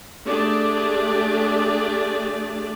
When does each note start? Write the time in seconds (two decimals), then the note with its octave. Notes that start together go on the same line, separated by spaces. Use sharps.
0.25 A3 D4 G4 G#4 D5